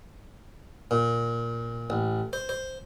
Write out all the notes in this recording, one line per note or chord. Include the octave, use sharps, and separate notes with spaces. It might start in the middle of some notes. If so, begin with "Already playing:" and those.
A#2
A1
C5
C5